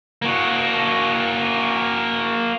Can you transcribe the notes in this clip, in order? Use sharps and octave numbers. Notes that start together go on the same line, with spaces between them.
A#3 F#4